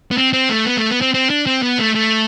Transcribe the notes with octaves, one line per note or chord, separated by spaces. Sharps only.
B3
C4
C4
A3
B3
A3
B3
C4
C4
D4
C4
B3
A3
A3